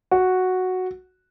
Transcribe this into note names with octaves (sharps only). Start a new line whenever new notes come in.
F#4